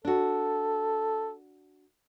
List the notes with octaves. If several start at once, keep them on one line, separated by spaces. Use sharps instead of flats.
D4 F#4 A4